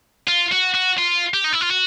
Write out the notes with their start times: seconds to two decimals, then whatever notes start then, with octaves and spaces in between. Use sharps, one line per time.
0.28 F4
0.52 F#4
0.74 F#4
0.98 F4
1.34 G4
1.44 D#4
1.53 E4
1.61 F4
1.70 F#4